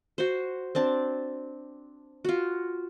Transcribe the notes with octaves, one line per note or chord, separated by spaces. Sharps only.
F#4 C5
C4 D4 A5
F4 F#4